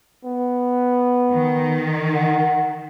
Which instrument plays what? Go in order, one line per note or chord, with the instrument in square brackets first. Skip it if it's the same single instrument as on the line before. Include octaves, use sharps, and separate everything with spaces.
[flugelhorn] B3
[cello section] D#3
[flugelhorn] F#5